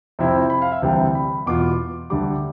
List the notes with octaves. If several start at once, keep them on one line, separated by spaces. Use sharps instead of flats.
F2 C3 F3 C4 E4
B5
F5
E5
D2 C3 E3 G3 G5
B5
E2 B2 B3 F4 D6
D2 D3 G3 D6